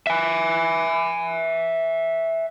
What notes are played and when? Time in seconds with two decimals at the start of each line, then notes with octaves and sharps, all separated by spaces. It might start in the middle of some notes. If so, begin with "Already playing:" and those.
0.07 E5 G#5